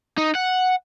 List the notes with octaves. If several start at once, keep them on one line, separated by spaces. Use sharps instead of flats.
D#4
F#5